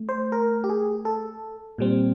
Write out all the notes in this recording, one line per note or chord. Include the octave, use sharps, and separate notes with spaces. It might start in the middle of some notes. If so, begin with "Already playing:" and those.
Already playing: A3
C5
A#4
G4
G#4
A4
A#2 G3 C4